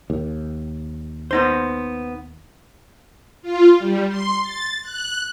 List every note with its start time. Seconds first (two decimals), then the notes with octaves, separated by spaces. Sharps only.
0.10 D#2
1.31 B3 D#4 C5
3.42 F4
3.78 G3
4.08 C6
4.41 A6
4.82 F#6